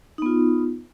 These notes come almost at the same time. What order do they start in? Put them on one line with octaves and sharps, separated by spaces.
D#4 B3 F4